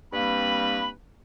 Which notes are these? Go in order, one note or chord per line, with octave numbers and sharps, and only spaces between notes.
G2 G3 A#3 C4 B4 B5